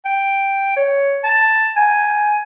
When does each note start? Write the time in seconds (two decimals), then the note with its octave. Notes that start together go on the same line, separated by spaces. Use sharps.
0.05 G5
0.77 C#5
1.24 A5
1.76 G#5